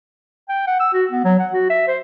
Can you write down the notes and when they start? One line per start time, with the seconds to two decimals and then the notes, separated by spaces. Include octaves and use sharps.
0.49 G5
0.67 F#5
0.80 E6
0.93 F#4
1.11 B3
1.24 F#3
1.39 F#5
1.53 F#4
1.70 E5
1.88 C5